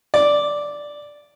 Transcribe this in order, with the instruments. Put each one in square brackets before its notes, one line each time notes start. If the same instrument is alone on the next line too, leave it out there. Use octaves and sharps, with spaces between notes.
[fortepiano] D5